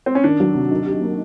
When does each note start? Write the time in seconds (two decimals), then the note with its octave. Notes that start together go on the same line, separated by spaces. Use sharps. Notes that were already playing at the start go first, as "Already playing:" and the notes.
0.06 C4
0.15 C#4
0.24 D#3 D4
0.40 F#3
0.55 C3
0.71 D#4
0.86 G4
1.01 A#3